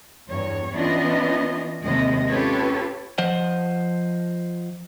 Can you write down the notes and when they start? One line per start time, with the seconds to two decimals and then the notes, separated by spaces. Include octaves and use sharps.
0.28 E2 G2 C#5
0.73 E3 B3 C#4 D4 F4 D#5
1.84 D#2 C3 G#3 D#5
2.28 C#4 F4 G4 A4 B4 C#5
3.18 F3 C5 D#5 F#5